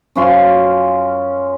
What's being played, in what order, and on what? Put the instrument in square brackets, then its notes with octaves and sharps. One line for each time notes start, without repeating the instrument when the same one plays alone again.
[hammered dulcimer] F#2 C#4 F4 C6